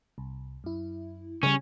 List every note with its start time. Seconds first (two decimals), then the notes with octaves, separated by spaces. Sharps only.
0.18 C2
0.64 F#2 E4
1.43 C#3 G3 C#4 G#5